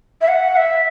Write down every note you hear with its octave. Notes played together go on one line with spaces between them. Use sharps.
E5
F#5
E5